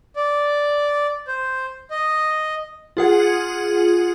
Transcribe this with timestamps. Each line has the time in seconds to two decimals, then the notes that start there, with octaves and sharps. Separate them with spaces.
0.16 D5
1.27 C5
1.91 D#5
2.97 F4 G#4 F#5